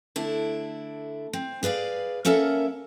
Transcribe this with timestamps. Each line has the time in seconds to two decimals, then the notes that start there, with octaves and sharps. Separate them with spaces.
0.16 D3 A3 D4 E4
1.33 C4
1.63 G#4 B4 D5 F5
2.25 A#3 C#4 A4 A#4 E5 F#5